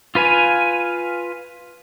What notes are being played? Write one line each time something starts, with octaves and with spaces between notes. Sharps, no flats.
F4 B4 F5 G#5